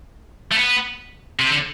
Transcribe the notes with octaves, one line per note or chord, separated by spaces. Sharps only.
A3
B3
C3
D3